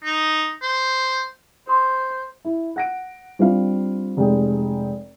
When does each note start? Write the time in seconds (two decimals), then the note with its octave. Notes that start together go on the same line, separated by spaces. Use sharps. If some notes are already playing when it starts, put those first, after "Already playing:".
0.04 D#4
0.62 C5
1.67 A4 C5 C6 D6
2.45 E4
2.76 F#5 A#6 D7
3.39 G3 C4 D4 F4 F5
4.17 F1 G#3 G5